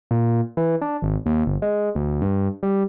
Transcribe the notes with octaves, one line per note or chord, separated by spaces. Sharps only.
A#2
E3
D4
G#1
D#2
G1
G#3
D2
G2
G3